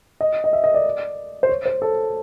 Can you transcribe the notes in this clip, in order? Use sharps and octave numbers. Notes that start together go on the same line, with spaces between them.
D#5
D#5
E5
D#5
D5
C5
C#5
C5
A4